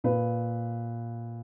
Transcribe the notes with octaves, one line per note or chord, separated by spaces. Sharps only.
A#2 B4